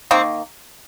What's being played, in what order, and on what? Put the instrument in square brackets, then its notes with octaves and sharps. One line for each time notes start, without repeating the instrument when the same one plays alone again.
[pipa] D#3 A#3 C4